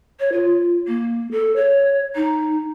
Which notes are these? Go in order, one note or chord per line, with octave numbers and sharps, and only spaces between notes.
C#5
F4
A#3
A4
C#5
D#4